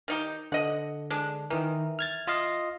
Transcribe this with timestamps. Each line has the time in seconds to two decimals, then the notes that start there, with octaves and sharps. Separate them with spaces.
0.08 D#3 D#4 G4
0.52 D3 D#5 F#5
1.10 G#3 D4
1.50 D#3 E3 A#4
1.99 F6 G#6 A6
2.27 F4 D#5 F5